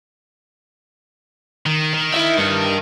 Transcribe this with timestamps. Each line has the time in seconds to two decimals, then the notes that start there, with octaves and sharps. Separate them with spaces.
1.66 D#3
1.94 D#3
2.14 E4 E5
2.38 G2